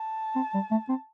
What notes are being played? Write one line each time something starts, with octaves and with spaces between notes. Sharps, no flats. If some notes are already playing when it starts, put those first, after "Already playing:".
Already playing: A5
C4
G3
A3
C4